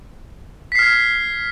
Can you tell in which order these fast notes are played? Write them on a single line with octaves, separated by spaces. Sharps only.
B6 C7 F6 G#6